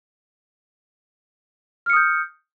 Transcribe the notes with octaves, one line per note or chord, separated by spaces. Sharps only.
D#6 F6 G6 C#7